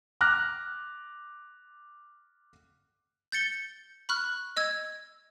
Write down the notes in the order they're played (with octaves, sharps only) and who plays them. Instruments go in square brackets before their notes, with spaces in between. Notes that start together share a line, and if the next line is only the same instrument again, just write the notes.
[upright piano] D6 F6 F#6 A#6
[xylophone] G6 A6 C#7 G7
B5 C#6 F6 F#6
D#5 E6 G#6